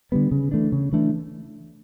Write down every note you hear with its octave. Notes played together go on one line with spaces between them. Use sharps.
D3 G3 B3
C#3
E3 A3 D4
C#3
E3 A3 D4